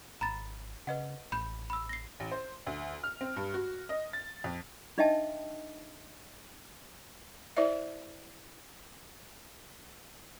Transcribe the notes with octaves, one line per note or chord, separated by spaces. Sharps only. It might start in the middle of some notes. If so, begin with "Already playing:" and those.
G#1 A#5 B5 A6
C#3 B4 D#5 F#5
A1 B5 G6
B5 E6
A#6 C7
A1
C5
D2
F6
C4
G2
F#4
D#5
A6
F2
D4 D#4 D#5 E5 G5 A5
E4 C5 D5 E5